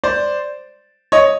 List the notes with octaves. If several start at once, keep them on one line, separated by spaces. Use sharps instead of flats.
C5 D5
C#5 D#5